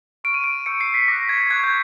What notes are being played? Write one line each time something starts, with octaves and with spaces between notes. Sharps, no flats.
C#6 F6 D7
D#7
D7
C#6 E6 G6 C#7
C7
B6
D6 F#6 A#6
G#6
C#6 F#6 G#6
G6